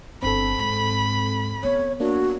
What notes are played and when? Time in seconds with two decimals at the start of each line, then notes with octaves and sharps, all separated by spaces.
0.22 G1 C4 D4 A4 B5
0.58 G#2
1.63 B3 C#5
2.00 A#3 D4 F#4